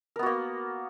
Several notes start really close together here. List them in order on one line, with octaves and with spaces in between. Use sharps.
A#4 B3 F#4 A#3